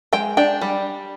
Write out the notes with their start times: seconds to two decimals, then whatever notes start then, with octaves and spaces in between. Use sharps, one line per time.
0.13 G#3 G5
0.37 D4 G5
0.61 G3